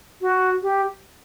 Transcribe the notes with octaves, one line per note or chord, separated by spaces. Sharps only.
F#4
G4